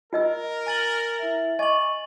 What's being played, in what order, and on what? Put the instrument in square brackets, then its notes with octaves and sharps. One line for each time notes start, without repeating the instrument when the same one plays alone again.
[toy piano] F4 D#5 E6 [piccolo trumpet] A#4
[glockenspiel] G#5 A6 F#7
[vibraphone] E4 E5
[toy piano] D#5 [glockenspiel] G#5 F#7 [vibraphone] C#6 D6